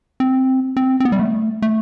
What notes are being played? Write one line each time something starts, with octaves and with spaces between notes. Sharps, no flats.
C4
C4
C4
B3
G3
A3
A3